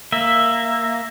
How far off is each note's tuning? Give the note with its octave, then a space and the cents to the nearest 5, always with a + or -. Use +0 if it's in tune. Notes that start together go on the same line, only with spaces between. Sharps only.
A#3 -5 E5 +5